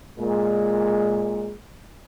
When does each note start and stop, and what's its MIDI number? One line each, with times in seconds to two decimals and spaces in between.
0.18 1.52 46
0.18 1.52 56